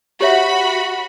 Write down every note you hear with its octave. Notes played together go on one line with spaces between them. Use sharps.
F#4 G4 C#5 E5 B5